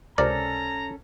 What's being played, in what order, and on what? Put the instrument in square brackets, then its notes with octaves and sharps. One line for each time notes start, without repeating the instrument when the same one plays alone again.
[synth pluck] C#2 C3 C5 [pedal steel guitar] C#4 A4 [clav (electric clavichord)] A#4 D5 [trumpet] A#5